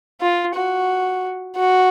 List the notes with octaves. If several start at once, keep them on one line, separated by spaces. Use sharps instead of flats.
F4
F#4
F#4